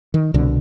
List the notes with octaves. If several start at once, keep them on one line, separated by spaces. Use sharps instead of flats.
D#3
C2 B2 D3